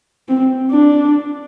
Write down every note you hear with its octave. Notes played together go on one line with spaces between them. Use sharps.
C4
D4